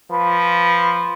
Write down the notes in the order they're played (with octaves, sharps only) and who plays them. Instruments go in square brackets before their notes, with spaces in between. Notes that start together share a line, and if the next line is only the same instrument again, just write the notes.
[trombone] F3 [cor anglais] B4